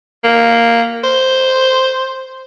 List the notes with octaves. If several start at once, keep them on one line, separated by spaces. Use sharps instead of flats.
A#3
C5